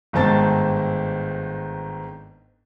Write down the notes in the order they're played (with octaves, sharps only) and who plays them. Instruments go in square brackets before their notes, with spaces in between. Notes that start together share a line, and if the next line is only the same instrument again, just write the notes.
[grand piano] G1 G#2 D#3 C4 A5 A6